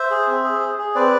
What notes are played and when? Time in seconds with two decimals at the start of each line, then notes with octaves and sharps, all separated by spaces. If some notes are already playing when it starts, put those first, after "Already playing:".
Already playing: C5 E5
0.10 G#4
0.27 C4
0.44 G#4
0.61 G#4
0.78 G#4
0.95 C4 B4 D5